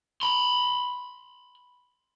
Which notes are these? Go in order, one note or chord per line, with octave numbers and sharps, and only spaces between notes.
B5 C6